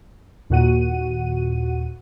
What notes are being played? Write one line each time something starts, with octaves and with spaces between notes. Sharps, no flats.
D#2 A#2 F#4 F#5 D#7